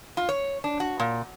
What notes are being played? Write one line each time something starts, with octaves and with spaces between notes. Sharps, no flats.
F4
C#5
D4
F#4
A#2